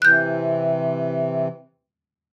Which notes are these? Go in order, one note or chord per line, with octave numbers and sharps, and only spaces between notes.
C3 E3 F#6 G6